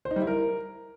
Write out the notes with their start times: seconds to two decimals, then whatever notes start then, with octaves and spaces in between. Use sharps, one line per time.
0.05 C5
0.11 D#4
0.16 G3
0.22 E4
0.27 A#4